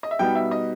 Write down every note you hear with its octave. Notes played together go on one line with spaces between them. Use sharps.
D#5
E5
B2 G3 B3 D#4 G5
E5
D#5